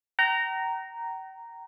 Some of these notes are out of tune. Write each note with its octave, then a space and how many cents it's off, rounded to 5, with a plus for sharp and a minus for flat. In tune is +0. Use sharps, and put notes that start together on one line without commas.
G5 -45 A#5 -5